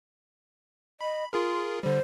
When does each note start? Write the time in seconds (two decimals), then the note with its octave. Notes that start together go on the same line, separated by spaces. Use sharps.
1.01 D#5 B5
1.33 F4 G#4 A#4 C6
1.83 D3 G3 C5